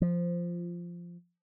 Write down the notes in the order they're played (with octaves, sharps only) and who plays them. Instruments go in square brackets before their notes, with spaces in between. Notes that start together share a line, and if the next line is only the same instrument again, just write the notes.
[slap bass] F3